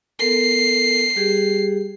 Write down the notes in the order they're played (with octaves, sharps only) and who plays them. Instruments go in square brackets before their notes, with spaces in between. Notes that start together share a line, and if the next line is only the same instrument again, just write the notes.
[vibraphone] B3 A4 A#4 [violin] C7
[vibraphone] G3 G4 G#4